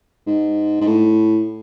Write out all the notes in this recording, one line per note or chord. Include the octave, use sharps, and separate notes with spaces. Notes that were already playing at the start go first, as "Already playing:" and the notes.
G#2
G#2
A2